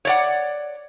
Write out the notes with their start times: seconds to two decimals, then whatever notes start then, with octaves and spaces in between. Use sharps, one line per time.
0.05 C#5 D5 F#5